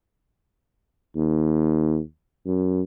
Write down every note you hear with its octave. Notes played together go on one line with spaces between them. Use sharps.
D#2
F#2